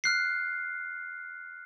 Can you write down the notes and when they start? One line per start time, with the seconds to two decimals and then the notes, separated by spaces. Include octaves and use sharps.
0.04 F6 F#6 C7